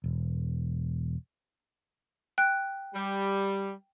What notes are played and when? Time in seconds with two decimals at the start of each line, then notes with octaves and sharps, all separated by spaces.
0.04 E1
2.38 G5 F#6
2.94 G3